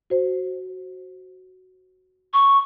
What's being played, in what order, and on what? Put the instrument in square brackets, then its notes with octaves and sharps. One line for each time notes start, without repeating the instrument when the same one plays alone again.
[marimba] F#4 C5
[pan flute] C#6